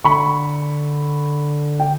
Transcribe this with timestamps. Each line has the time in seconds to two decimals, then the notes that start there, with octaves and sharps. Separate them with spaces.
0.04 D3 B5 C#6
1.80 G5